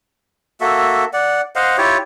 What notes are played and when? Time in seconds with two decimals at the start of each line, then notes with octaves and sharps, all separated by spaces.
0.61 A#3 F#4 A4 E5
1.13 D5 F#5
1.56 C5 D#5 F5 F#5
1.78 E4 F4 G4 C#5